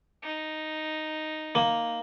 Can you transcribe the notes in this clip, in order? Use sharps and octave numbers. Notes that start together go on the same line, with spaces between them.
D#4
A#3